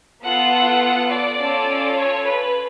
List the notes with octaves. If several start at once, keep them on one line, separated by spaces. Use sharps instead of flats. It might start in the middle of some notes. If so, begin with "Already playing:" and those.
B3 F4 A4 F#5
D5
C#4 F4 A4
C#5
B4